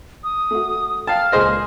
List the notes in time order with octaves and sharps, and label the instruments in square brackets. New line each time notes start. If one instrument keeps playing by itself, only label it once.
[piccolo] D#6
[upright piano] A3 F#4
[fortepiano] F5 A5 [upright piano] G5 [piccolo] F6
[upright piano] C#2 A#2 A#6 [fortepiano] G#4 C5 D#5